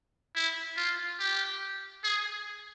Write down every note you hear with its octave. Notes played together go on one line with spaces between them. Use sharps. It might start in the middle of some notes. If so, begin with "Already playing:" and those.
E4
F4
G4
G#4